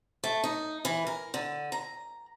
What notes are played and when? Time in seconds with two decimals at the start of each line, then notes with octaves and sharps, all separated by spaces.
0.24 A3
0.44 D#4
0.85 E3
1.07 A#4
1.34 D3
1.72 A#5